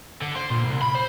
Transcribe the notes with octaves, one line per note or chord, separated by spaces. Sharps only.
D3
C5
A#2
C2
B5
C5